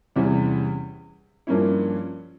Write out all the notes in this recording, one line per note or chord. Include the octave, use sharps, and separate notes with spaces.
E2 C3 G3 C#4 E4
G2 F3 A#3 C#4 E4